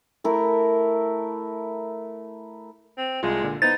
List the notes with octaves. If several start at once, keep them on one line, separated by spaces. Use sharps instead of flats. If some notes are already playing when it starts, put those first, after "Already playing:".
A3 E4 A#4
C4
C2 G#3 F4
A#2 D3
B3 D#4 E4 C5 A6